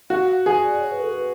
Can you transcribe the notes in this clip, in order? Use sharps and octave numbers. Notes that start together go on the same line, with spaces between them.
F#4 F5
F#5
G#4
D5
C#5
B4
A4
B4